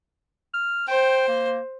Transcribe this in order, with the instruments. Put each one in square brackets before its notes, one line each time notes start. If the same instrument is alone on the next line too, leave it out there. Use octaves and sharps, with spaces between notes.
[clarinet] F6
[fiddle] C5 [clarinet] G5
[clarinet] A#3